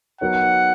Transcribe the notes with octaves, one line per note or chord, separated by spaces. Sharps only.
F#3 B3 D#4 A#4 C#5 F#5